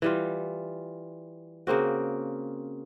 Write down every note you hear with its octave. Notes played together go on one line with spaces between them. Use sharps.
E3 G3 F4
C#3 A#3 C4 F#4